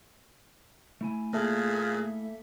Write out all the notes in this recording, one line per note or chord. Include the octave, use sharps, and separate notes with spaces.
A3 E4 G#5
A#2 A#3 G#4 A4 E5